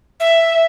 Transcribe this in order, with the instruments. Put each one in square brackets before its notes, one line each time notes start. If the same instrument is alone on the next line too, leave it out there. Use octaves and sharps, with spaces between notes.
[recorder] E5